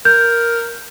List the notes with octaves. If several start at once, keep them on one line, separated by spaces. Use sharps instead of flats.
A#4 G6